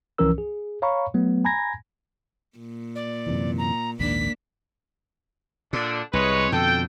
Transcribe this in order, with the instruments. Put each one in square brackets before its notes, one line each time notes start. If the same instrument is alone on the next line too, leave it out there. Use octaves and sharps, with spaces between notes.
[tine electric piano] C2 E3 F3 C#4 A#4 E6
G#4
C#5 F5 A#5 B5 C#6
F#3 A3 B3
G#5 A#5 B5 G#6 A#6
[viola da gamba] A#2
[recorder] D5
[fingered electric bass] F#2 C3 E3
[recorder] A#5
[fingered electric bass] A#1 D#2 G#2 [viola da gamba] A#3 D4 [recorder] B6
[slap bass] A#2 [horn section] D3 D4
[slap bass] C2 [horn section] G#3 B4 C#5
[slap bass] F2 B2 D3 [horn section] A4 G5